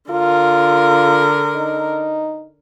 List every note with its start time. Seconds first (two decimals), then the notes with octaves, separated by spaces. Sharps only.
0.11 D3 F4 A#4
1.56 D#4